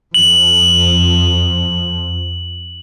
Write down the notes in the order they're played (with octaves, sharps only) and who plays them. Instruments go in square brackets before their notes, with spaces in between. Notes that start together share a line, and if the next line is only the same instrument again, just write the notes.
[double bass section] F2 F3 [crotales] F#7